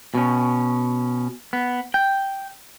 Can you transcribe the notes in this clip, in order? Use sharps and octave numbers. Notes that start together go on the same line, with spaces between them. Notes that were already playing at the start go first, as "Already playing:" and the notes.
B2 C#4
B3
G5